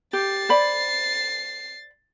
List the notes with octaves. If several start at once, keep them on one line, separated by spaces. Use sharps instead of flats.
G4 A6 C7
C5 D5 B5